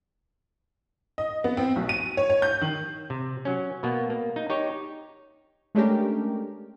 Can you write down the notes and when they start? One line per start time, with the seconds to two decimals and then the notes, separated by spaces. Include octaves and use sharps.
1.18 D#5
1.44 B3
1.57 C4
1.76 B1
1.89 D#7
2.17 C#5
2.30 C#5
2.42 G6
2.61 D#3
3.10 C3
3.45 F#3 C#4
3.83 B2 A#3 B3
4.10 A#3
4.36 D#4
4.50 D#4 G4 C#5
5.75 G#3 A3 C#4 D4 G4 A#4